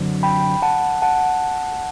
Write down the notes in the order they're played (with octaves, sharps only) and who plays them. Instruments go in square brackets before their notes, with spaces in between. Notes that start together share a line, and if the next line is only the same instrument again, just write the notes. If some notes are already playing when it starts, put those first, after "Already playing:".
Already playing: [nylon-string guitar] F#2 D3 F#3 C4
[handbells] G5 B5
F#5 A5
F#5 A5